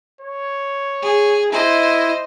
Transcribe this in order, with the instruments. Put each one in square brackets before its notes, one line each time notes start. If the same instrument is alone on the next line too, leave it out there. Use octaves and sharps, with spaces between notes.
[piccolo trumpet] C#5
[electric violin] G#4
[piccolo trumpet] E4 [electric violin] C5 D#5